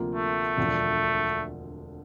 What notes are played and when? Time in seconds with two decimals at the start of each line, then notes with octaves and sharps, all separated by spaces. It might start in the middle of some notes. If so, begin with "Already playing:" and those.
Already playing: D2 C3 F3 A#3 F4
0.15 A3
0.58 E1 D2 D3 F3